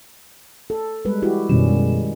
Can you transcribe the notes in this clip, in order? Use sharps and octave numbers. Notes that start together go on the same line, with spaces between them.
A4
G3 G#3 B4
E4 F#4 G4
F#2 B2 D#3 G3 C#4 E7
G#3